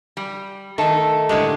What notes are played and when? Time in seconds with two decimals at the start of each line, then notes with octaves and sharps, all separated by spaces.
0.17 G3
0.78 D#3 A3 A4 E5 A5
1.29 A2 D3 G#3 G4 G#6 C#7